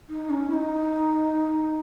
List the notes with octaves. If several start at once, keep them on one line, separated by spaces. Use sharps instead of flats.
D#4
C#4
E4
D#4